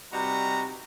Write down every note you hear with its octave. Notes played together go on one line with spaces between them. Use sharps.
C3 G3 D#4 F#4 B4 A#5